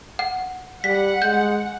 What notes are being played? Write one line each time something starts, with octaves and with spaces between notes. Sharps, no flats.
F#5
G3 F#5 B6
G#3 G6